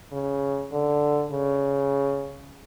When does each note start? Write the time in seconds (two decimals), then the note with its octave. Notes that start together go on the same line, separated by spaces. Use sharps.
0.12 C#3
0.72 D3
1.31 C#3